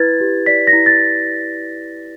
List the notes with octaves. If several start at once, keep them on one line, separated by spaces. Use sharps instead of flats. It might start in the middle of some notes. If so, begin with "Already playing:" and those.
Already playing: E4 B4 G#6 A6
G4
D5 B6
A#6
E4
A6